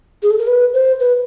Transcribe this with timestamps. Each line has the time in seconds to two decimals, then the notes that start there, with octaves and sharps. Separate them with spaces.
0.23 G#4
0.31 A4
0.38 A#4
0.47 B4
0.74 C5
1.00 B4